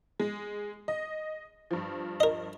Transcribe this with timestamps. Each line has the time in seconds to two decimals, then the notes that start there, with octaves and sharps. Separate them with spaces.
0.20 G#3
0.88 D#5
1.71 G2 F3
2.20 A#4 D#5